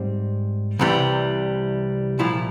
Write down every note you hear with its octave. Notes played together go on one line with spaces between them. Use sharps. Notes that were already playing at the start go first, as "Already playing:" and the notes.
Already playing: G#2 G3 C4
C2 C3 E3 G3
C2 A#2 F3 E4